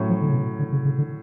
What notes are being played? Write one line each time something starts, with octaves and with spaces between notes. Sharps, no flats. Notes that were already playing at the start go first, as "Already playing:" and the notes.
Already playing: A2 F#3 C#4
F3
D3
C#3
B2
D3
C#3
C#3
D3